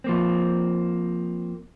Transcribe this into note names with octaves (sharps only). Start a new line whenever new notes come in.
F3 A#3 C4